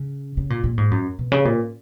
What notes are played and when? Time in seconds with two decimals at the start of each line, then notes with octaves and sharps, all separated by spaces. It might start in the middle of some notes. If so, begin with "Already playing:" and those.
Already playing: C#3
0.37 C#3
0.50 A#2
0.64 A#2
0.78 G#2
0.91 F#2
1.19 B2
1.32 C#3
1.45 A#2